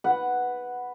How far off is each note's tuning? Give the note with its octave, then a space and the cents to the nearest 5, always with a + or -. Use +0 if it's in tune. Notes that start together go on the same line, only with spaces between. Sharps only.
B4 +0 F#5 +0